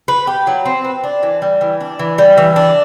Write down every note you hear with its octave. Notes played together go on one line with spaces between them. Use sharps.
B4
G4
F#3
C4
B4
D4
E3
G3
E3
D4
E3
G3
E3
D4